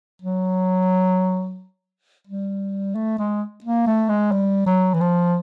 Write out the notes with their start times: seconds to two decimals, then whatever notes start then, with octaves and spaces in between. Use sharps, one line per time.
0.22 F#3
2.27 G3
2.95 A3
3.19 G#3
3.64 A#3
3.87 A3
4.09 G#3
4.32 G3
4.66 F#3
4.94 E3
5.00 F3